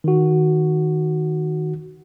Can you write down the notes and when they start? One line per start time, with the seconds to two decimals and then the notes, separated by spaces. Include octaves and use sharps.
0.04 D#3 F#4